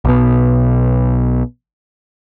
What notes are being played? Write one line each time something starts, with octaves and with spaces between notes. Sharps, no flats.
B1 B2